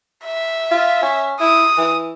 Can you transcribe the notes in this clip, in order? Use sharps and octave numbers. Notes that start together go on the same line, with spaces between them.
E5
F4
C#4
E4 D#6
E3